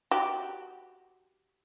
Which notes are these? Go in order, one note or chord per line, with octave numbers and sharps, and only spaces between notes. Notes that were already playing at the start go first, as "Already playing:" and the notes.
F#4 G4